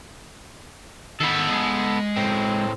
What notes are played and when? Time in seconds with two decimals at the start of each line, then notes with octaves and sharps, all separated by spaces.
1.20 D#3 B3 A4 B5
1.49 G#3
2.17 A2 C4